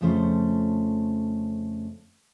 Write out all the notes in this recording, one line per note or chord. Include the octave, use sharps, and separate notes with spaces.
F2 C#3 F3 A3 C#4 C5